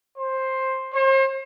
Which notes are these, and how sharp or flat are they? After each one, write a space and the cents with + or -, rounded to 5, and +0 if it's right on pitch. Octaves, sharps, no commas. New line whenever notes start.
C5 +10
C5 +40